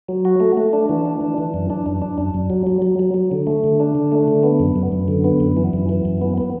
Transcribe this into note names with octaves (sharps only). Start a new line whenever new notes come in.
F#3
F#4
A3
A3
D4
E3
D4
E3
E3
F#2
D4
F#2
D4
F#2
F#2
F#3
F#3
F#3
F#3
F#3
D3
A3
D3
D4
D3
A3
D3
B3
F#2
F#2
F#2
D3
B3
F#2
E3
F#2
E3
F#2
B3
B3